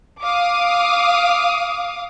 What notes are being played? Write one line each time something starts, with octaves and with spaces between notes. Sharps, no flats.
F5 D6 D#6